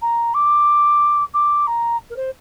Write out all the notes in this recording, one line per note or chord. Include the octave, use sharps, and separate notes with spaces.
A#5
D6
D6
A#5
A#4
C5